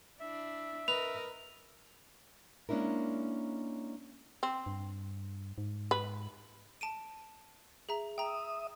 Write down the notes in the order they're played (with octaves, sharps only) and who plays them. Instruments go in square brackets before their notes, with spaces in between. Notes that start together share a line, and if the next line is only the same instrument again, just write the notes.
[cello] D4 E4 [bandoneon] E5
[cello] A#4 D#5 [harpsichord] B4 [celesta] F7
[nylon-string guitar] G#3 A#3 C#4 D4 E4 A#4
[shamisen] C4
[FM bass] G2
G#2
[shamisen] B4
[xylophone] A5 D7 D#7
G#4 E5 A#5
[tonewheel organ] E5 D#6 [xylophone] G5 A#5